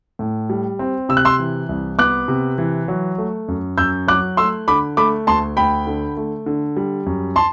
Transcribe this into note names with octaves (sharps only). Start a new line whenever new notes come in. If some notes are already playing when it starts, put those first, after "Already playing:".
A2
G3
C4
C3 E6
F#6
C6 E6
E3
C2
B3 D6 F#6
C3
E3
F#3
A3
F#2
F#2 E6 G6
F#3 D6 F#6
A3 C6 E6
D3 B5 D6
A3 B5 D6
D2 A5 C6
D2 G5 B5
D3
A3
D3
G3
F#2
A5 C6